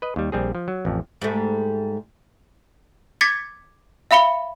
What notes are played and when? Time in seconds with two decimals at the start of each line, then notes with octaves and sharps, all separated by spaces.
0.02 B4 D#5
0.16 D#2 G3
0.32 A#1 G3 C4 G#4
0.55 F3
0.68 F#3
0.85 A1 F2
1.22 G#2 G3 A3
3.21 D6 G#6 A6 B6 C#7
4.11 E5 F5 B5 C#7 G7